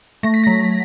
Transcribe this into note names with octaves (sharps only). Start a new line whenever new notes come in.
A3 A#6
B6
F#3 A#6